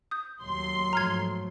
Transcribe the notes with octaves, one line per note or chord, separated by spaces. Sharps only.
D#6 G6
D#2 F#3 C6
G#2 F3 A3 A#5 F6 G#6